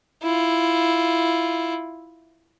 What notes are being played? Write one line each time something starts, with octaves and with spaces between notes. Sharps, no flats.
E4 F4